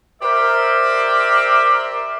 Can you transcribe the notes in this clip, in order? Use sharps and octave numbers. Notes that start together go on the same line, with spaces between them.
G4 A#4 C5 D5 E5